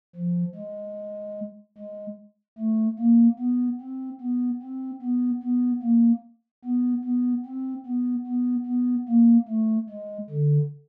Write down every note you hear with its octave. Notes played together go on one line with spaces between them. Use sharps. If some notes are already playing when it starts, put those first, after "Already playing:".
F3
G#3
G#3
A3
A#3
B3
C4
B3
C4
B3
B3
A#3
B3
B3
C4
B3
B3
B3
A#3
A3
G#3
D3